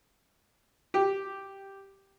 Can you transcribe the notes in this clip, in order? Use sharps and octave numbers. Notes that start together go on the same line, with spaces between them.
G4